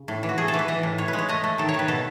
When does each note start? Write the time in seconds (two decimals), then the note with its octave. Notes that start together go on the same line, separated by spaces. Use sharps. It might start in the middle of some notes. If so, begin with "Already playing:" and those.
Already playing: C#3
0.08 A2
0.23 E3
0.29 F#4
0.38 A3 G#4
0.48 A4
0.54 E3
0.59 B4
0.68 E3 D#5
0.83 A2
0.98 A2 C#5
1.08 B4
1.13 G#3
1.18 C#5
1.28 A3 D#5
1.44 A3
1.58 D#3 A4
1.69 C#5
1.74 D#3 B4
1.88 B2 A4